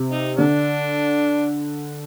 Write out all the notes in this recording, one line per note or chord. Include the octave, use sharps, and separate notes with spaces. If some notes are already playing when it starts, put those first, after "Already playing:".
Already playing: C3
D#4
D3 D4